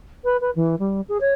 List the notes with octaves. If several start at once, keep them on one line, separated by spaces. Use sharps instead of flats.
B4
B4
E3
G3
G#4
C#5